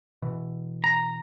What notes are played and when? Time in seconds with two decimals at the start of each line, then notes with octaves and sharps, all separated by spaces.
0.22 B2 E3
0.84 A#5